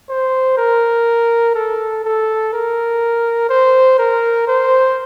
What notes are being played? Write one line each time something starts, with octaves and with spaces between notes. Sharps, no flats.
C5
A#4
A4
A4
A#4
C5
A#4
C5